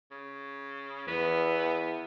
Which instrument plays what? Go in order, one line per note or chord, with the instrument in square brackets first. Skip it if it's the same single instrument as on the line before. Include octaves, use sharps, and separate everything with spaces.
[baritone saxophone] C#3
[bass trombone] E2 [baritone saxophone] B3